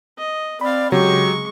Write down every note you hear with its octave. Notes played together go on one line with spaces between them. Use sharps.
D#5
C4 D5 F5 B5
C#3 F#3 G#3 G4 C#6